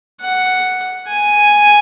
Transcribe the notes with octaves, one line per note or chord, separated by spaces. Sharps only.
F#5
G#5